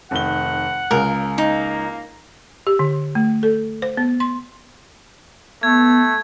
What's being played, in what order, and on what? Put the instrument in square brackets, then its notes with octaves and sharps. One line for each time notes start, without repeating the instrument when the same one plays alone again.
[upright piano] F1 D#3 G7 [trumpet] F#5
[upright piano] C#2 C#3 [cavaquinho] A#4
[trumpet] A#3 [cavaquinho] D#4
[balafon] G4
D3
A3
A4
C5
B3
C6
[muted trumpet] A3 [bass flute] B3 [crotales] G#6